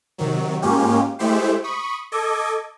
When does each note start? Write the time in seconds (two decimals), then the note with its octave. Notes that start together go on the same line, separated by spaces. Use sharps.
0.18 C3 D#3 F#3
0.62 G#2 G#3 A#3 C#4 F4 G4
1.19 G#3 A3 E4 G4 C5
1.64 B5 C#6 D#6
2.12 A4 D#5 D6 G#6